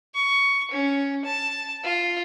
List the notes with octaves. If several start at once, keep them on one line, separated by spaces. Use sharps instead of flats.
C#6
C#4
A5
F4